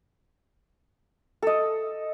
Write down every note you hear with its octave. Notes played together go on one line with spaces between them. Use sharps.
A4 D#5